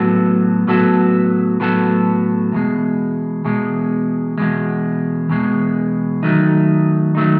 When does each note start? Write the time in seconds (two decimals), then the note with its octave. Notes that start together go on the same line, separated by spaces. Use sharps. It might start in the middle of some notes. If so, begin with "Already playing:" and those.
Already playing: A2 F#3 B3 F#4 A4
0.67 A2 F#3 B3 F#4 A4
1.60 A2 F#3 B3 F#4 A4
2.52 E2 B2 G#3
3.45 E2 B2 G#3
4.38 E2 B2 G#3
5.30 E2 B2 G#3
6.23 D#3 F#3 A3 D#4
7.15 D#3 F#3 A3 D#4